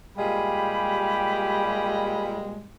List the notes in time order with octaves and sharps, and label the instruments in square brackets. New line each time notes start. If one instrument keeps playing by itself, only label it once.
[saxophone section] A#2 G3 G#3 [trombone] G4 [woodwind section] F5 G#5 B5